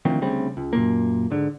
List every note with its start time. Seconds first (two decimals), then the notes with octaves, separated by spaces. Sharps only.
0.05 D2 D#3 F3 C4
0.21 D2 C#3 G3 C4
0.57 C#2
0.73 F#2 A#2 A#3
1.30 G#2 D3